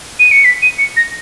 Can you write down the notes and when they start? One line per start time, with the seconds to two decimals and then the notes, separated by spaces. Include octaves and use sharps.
0.19 D#7
0.31 C#7
0.45 B6
0.62 D#7
0.78 C#7
0.97 A#6